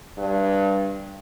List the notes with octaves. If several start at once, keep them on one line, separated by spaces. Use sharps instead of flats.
G2